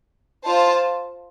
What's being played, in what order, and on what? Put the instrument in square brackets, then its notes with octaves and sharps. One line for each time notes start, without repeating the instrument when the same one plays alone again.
[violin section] F4 C5 A5